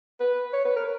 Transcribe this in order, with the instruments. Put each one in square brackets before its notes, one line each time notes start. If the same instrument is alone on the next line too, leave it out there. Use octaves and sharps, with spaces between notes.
[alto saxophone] B4
C#5
B4
A#4